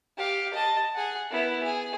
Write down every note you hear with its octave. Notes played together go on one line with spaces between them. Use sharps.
G4 F5
D#5 A5
G#4 F#5
B3 E4
G#4